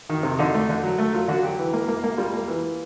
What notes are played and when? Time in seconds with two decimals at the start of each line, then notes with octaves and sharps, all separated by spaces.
0.10 D#3
0.23 C3
0.39 D3 D#4
0.54 A3
0.69 D3
0.84 F#3
0.98 A3
1.13 F#3 F4
1.28 D3 F#4
1.43 F#3 G4
1.59 E3
1.73 A#3
1.88 A#3
2.04 A#3
2.17 G3 F4
2.34 A#3
2.48 E3